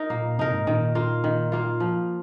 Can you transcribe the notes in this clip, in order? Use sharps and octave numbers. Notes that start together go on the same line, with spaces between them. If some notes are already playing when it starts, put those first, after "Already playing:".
Already playing: D#4 A#4
A#2 A#3
A#2
C3 D#4 A#4
G#2
A#2 D#3
A#3 F4
D#3
A#3 F4
F3